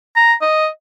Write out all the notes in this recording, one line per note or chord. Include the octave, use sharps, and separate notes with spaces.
A#5
D#5